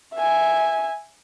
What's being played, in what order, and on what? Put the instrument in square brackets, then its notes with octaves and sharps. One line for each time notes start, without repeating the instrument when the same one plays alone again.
[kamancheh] E5 G#5